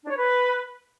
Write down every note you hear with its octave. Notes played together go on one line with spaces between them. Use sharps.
D4
C#5
B4